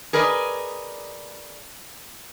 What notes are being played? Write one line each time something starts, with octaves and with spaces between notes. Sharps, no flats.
G#4 A#4 B4 D5 D#5